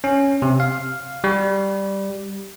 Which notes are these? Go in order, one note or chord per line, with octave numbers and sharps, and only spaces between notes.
C#4
C3
F5
G3